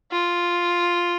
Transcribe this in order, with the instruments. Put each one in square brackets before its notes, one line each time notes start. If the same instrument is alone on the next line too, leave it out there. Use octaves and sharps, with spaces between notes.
[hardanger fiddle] F4